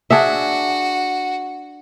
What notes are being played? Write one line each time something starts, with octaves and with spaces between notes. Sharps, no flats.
D4 F#4 G#4 E5